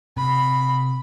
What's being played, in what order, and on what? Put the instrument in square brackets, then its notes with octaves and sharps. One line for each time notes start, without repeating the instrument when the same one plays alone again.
[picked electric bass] C3 [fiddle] B5